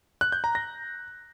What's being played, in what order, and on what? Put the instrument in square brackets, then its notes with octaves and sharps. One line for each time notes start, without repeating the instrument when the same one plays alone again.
[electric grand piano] F#6
G6
A#5
A#6